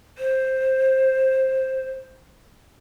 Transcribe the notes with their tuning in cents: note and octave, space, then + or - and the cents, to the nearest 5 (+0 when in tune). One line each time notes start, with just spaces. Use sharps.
C5 +10